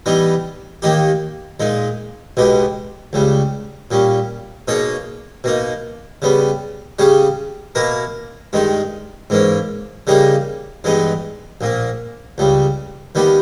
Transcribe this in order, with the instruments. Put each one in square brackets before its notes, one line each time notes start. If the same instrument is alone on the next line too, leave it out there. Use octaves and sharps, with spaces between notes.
[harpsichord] E3 G3 B3 D#4
D#2 D#3 A#3 D#4 G4
A#2 G#3 D#4
B1 B2 G#3 B3 G4
C#2 C#3 G3
A#2 G3 C#4
B2 A#3 D#4 G#4 C#5
B2 A#3 D#4
C#3 G3 B3
C#3 G3 C#4 G#4
B2 A#3 E4 A#4
G2 D#3 G#3 D#4
G#2 E3 A#3 C#4
C#3 G3 A#3 D#4 G#4
G2 E3 G#3 B3 D#4
A#1 A#2 A#3
C#2 C#3 G3
D#2 D#3 G3 B3 G4